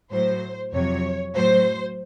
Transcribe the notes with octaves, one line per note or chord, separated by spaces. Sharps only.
A2 F#3 C5
F2 C3 F#3 C#5
A2 F#3 C5